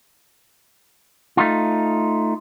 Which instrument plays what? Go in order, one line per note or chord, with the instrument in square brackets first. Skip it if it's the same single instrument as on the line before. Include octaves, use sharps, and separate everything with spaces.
[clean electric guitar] A3 D#4 F4